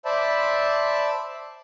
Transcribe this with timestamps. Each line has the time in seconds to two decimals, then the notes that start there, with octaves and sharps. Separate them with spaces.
0.05 C5 D5 E5 A5 B5